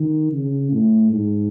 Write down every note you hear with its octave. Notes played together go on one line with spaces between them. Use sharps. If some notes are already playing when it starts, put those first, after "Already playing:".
Already playing: D#3
C#3
A2
G#2